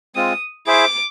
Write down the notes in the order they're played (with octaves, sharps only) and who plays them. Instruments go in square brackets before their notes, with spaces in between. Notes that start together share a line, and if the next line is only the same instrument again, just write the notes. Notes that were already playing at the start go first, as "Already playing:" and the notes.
[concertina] G#3 C4 F4 [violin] D#6
[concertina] E4 G#4 C5 E5 [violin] D6